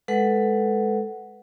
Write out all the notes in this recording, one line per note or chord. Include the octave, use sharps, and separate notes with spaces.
G#3 A4 B4 F#5